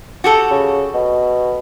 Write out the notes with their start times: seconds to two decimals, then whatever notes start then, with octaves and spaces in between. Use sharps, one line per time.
0.24 F#4 G4 A4
0.51 C#3
0.94 B2